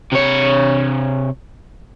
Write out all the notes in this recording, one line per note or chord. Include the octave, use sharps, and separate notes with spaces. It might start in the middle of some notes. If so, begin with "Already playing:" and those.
C3 C#5